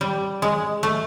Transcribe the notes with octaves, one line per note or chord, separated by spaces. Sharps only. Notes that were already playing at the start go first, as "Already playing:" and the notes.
G3
G#3
A3